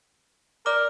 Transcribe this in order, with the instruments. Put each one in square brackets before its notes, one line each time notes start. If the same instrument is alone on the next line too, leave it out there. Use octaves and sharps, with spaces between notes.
[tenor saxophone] A#4 [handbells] D5 D6